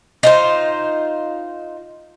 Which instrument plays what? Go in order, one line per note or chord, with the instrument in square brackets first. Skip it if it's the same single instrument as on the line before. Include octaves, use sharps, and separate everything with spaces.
[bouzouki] D#4 F4 C5